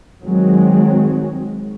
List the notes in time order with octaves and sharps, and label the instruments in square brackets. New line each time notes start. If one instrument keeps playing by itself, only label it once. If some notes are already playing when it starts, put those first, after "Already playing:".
[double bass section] D#3 F#3 G#3 C4